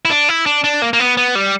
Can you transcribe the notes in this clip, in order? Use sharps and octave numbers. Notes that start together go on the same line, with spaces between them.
E4
D4
E4
D4
D4
A#3
A#3
B3
B3
G3